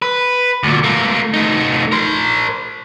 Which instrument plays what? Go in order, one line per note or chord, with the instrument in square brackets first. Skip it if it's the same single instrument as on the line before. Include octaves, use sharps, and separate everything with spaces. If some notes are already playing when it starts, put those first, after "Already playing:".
[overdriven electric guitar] B4
D2 A#2
A3 A#3
A3 D#4
A#4 C5